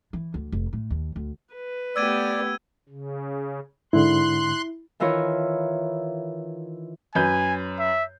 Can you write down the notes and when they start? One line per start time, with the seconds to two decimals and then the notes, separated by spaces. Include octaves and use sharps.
0.13 E3
0.34 D2
0.52 F1
0.73 A2
0.90 D#2
1.16 D2
1.55 B4
1.96 A3 B3 G4 D5 E6 G#6 D#7
2.89 C#3
3.93 G#2 D3 E4 C6 F#6
5.00 D#3 E3 E4 F4 A#4 C#5
7.15 F#2 B4 G#5 G6
7.79 E5